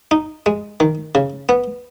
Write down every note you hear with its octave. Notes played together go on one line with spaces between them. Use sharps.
D#4
G#3
D#3
C#3
B3